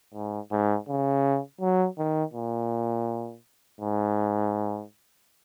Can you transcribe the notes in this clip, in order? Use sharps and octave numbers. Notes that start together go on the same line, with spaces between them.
G#2
G#2
C#3
F#3
D#3
A#2
G#2